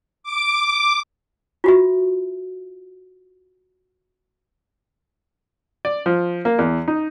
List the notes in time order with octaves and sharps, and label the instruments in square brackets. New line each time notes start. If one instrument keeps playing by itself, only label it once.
[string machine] D6
[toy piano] F4 F#4 E5
[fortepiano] D5
F3
A#3
E2
D#4